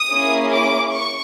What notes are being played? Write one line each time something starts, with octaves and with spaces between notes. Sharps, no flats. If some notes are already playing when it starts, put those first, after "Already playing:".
Already playing: D#6
A#3 C#4 E4 G#4
D6
C#6